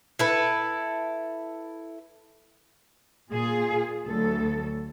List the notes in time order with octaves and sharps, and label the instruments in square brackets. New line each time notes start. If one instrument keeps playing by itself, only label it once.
[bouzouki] E4 A4 B4
[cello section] A#2 F4 G#4
D2 F#3 A4